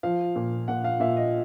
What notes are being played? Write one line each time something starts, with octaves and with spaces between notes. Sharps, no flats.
F3 F5
A#2
A#2 F#5
F5
A#2 E5
D#5